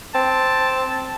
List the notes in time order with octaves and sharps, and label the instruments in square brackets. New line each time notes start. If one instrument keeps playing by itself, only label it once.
[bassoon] C4 [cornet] A5